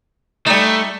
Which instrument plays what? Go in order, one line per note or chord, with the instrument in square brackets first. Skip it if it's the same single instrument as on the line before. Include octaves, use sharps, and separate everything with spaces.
[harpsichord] G3 D#4 [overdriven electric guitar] A3